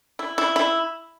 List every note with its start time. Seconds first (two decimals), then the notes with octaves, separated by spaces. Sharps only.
0.19 E4
0.38 E4
0.56 E4